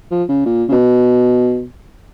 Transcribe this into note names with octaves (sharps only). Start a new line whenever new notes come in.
F3
C#3
A#2
C#3
B2